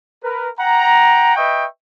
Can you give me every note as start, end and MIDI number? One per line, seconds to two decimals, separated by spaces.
0.23 0.48 70
0.23 0.48 71
0.59 1.33 78
0.59 1.33 79
0.59 1.33 82
1.36 1.64 71
1.36 1.64 75
1.36 1.64 76
1.36 1.64 79
1.36 1.64 85